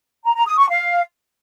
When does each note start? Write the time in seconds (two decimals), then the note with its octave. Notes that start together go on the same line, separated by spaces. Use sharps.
0.24 A#5
0.36 A#5
0.47 D#6
0.58 C#6
0.70 F5